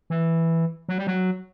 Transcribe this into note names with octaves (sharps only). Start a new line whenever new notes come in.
E3
F#3
G3
F#3